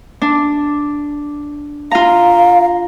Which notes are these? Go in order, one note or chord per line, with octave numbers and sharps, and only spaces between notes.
D4
F4 F5 A#5